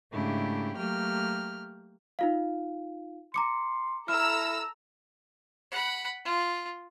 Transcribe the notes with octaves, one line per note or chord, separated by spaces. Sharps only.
G#2 C#3 A3 D4 E4 G4
F#3 A3 A#3 G4 G5 F6
D#4 F4 F5
A#5 C6 D6 C#7
E4 A4 A#5 E6 F6
F#5 B5
F4